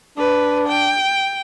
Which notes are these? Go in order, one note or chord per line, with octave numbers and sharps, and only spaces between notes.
D4 B4
G5